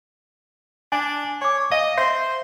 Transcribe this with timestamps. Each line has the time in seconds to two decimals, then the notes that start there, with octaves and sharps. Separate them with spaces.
0.92 D4 G#5
1.42 C#5 G#5 D6
1.71 D#5 F5
1.98 C5 E5